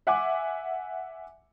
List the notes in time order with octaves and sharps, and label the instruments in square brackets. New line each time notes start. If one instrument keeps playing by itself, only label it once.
[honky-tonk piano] E5 F#5 G#5 D6